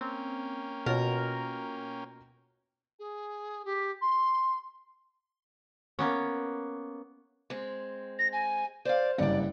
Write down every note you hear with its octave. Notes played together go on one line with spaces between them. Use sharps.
A#3 C4 C#4 G5
B2 F4 F#4 A#4 C#5
G#4
G4
C6
A#3 B3 C#4
G#3 C4
A#6
G#5
C5 D5 F5
F#1 G2 D5 F#5 G5